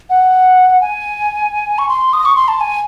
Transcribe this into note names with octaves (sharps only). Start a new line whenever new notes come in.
F#5
G#5
C#6
C6
D#6
C#6
C6
A5
G#5